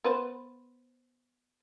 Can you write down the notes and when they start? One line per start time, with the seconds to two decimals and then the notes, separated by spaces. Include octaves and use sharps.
0.04 B3 B4 C5